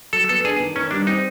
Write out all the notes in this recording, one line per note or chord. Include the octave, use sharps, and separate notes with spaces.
F#3 A4
B3 A4
D4 G#4
D#3
D#3 C#4
G3 D4
C4 D#4